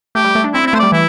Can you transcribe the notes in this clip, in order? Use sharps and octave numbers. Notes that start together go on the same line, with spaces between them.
A3 G4
G3
A3
D4
C4 E4
C4
E4
A3 C5
G3 D5
E3 E4